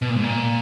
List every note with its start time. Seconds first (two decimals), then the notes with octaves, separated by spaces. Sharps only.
0.02 B2
0.09 A#2
0.16 G#2
0.24 A#2